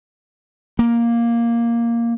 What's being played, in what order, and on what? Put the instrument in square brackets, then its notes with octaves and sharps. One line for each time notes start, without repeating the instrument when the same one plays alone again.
[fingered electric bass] A#3